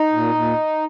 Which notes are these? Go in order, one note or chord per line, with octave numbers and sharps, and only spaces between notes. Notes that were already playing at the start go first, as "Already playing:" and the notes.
Already playing: D#4
A#2
A#2